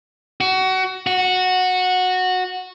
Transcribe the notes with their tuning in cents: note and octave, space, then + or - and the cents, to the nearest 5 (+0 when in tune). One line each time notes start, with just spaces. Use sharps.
F#4 +25
F#4 -10